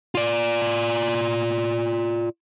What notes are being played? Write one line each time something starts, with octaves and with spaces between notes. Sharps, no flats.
F4 D5